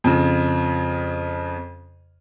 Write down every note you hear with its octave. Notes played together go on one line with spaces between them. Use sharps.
F2 C#3